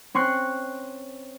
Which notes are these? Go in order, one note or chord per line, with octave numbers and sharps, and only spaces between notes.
C4 C#4 C6 C#6 F#6